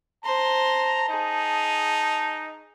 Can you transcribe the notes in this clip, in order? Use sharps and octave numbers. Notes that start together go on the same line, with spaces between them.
C5 A5 A#5 C6
D#4 G#4